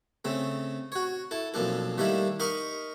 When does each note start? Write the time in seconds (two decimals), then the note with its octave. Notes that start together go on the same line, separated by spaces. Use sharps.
0.25 C#3 A3 C4
0.92 F#4 C#5
1.31 E4 A4
1.54 B1 F2 A#3 D4 A4
1.98 D#3 G3 A3 A#3 D4 E4
2.40 D#4 A#4 D#5 A#5 B5 C#6